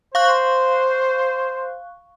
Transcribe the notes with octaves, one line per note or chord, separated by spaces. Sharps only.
C5 F5 C#6 F#6